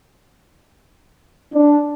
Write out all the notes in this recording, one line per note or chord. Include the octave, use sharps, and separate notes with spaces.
D4